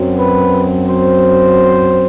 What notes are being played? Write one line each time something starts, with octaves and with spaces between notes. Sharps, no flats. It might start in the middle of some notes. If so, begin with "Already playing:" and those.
Already playing: F#2 F#3 C4
B4
C5